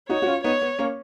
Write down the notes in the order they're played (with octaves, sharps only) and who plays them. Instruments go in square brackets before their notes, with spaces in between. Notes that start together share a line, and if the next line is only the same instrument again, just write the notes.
[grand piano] D#4 F#4 [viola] C#5
[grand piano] F#4
C#4 F4
[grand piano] B3 D#4 [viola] C#5
[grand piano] B3
A#3 C#4